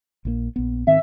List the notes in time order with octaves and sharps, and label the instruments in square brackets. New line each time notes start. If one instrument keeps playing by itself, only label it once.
[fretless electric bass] A#1 D3 A#3
A#1 B3
[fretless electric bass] G#2 D#3 C4 [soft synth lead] E5